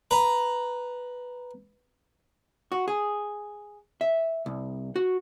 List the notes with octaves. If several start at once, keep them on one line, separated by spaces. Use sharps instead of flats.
B4 A#5
F#4
G#4
E5
C2
F#4